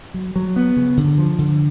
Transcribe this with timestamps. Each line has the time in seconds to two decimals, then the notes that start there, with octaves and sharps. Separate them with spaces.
0.14 F#3
0.36 F#3
0.56 B3
0.76 C#3
0.97 D3
1.18 F3
1.39 D3